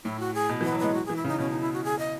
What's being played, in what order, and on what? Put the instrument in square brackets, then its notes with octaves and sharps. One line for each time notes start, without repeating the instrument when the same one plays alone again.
[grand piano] A2 [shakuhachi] E4
[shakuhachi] F#4
G#4
[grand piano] B2
E3
[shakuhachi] B3
[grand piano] F#3
[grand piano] G#3 [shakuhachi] B3
[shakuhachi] F#4
[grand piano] E3 [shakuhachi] G#4
[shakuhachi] E4
[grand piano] C#3 [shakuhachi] D#4
[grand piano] B2 [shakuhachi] C#4
[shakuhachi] D#4
E4
F#4
G#4
D#5